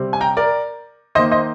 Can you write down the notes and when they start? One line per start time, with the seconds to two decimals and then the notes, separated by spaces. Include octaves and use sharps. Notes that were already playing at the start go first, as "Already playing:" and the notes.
Already playing: C3 G3 C4
0.13 G#5
0.21 G5 A#5
0.37 A#4 D5
1.15 D#3 A#3 C5 D#5
1.31 C5 D#5